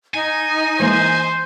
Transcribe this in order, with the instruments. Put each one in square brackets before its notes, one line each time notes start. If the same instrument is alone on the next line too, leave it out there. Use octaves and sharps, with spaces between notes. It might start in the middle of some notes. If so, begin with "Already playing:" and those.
[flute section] D#4 [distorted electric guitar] G#5
[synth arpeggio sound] E3 G#3 A#3 [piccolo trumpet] C5